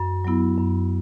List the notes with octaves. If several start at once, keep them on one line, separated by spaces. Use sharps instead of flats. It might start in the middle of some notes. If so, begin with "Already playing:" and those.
Already playing: F#2
F#3 B3 E4
F#2